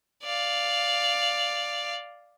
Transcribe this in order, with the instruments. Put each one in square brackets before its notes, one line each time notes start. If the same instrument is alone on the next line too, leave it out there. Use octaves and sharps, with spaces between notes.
[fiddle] D5 F5